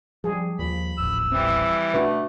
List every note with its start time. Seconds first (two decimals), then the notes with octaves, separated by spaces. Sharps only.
0.24 F3 G3 G#4
0.59 D#2 F3 B5
0.98 D#1 A1 E6
1.32 E3 G3 C4
1.94 B2 A3 D4 F#4 B4